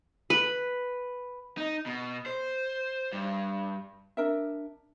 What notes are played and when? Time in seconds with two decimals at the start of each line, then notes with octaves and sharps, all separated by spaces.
0.30 B4
1.57 D#4
1.86 B2
2.26 C5
3.13 G2
4.17 D4 A#4 E5